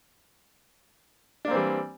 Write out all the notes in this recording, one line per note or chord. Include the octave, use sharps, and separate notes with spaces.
E3 G3 A#3 C4 D4